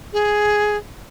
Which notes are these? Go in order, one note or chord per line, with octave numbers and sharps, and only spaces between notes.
G#4